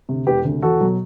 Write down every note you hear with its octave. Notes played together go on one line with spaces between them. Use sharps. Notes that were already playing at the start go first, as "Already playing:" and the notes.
D2 C3
E1 G4 B4
D2 C3
E2 F#4 A4
B2 F#3